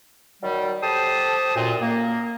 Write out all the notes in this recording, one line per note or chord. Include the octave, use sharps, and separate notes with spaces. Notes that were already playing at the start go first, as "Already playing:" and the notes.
D#3 F#3 G3
G4 A4 C5 A5 D#6
F#2 A#2
A#3